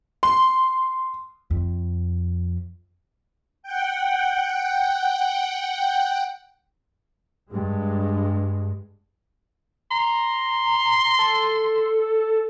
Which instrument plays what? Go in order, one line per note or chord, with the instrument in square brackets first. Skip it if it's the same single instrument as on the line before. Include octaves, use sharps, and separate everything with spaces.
[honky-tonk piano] C6
[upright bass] F2
[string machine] F#5 G5
[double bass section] G2 G#3
[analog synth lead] A#5 [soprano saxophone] C6
[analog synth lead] A4